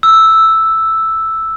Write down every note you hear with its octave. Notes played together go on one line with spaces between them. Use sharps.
E6